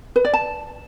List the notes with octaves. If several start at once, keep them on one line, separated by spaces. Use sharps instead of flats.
B4
D5
A5